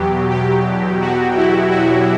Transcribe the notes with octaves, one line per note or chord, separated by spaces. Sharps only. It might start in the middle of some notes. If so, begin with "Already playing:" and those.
Already playing: E2 B2 F#3 G4
G4
F#4
E4
F#4